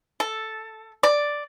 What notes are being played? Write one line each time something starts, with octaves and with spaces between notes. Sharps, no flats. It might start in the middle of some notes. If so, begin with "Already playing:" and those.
A4
D5